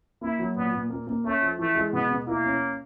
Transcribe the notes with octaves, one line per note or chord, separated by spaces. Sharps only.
A#3 E4
F#3
A#2 B3
A#2
A#3
A#3
A3 C#4
F3
E3 A3
G#3
B2 B3
B2
A#3 E4
C#4